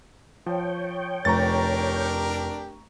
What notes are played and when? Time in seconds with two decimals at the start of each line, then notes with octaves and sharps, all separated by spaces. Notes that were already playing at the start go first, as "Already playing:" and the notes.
0.46 F3 C#5 G5
1.25 F1 D4 G4 A#4 A#5 C#6 A6